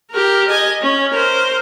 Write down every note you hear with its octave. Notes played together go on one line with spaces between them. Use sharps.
G4 A#4
D#5 G#5
C#4
A#4 C5